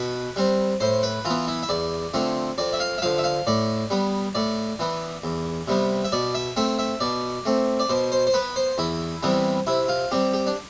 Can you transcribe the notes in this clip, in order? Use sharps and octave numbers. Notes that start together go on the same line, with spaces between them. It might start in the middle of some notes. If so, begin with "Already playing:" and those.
Already playing: B2 B4
G3 C4
A2 C5
B4
E3 B3 F4
E4
E5
E2 D5
D3 F3 A3 C4
F2 D5
E5
F5
E5
D3 F3 F5
E5
F5
A2 D5
G3 B3
A2 D5
E3 B3
E2
C3 G3 B3
E5
B2 D5
E5
A3 C4 E5
E5
B2 D5
A3 C4
D5
B2 C5
C5
C5
B3 B4
C5
E2 E4
C3 E3 G3 B3
C3 E4
F4
G3 C4 G4
G4
D4